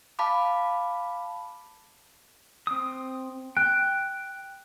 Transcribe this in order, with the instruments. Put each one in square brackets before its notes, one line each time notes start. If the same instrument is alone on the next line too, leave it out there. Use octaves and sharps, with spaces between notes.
[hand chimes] F5 A5 B5 D6
[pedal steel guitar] C4 D#6
[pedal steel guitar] G5 [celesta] F#6